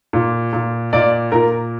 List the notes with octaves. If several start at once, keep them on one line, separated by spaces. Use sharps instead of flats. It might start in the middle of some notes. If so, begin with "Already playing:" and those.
A#2
A#2
A#2 D5
A#2 A#4